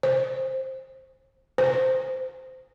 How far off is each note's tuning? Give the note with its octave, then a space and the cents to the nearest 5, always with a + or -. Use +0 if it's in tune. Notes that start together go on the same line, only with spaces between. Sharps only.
C5 +15
C5 -15